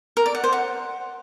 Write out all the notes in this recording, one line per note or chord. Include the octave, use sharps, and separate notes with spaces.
A#4
D5
F#5
C5
F#5